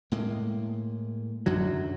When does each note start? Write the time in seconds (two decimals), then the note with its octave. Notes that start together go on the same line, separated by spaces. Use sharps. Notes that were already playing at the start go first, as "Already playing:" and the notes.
0.12 A2 G#3 A#3
1.46 F#2 D3 F#3